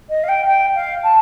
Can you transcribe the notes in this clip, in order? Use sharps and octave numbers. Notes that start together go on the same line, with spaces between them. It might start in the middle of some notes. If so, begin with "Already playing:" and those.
D#5
F5
G5
G5
F5
A5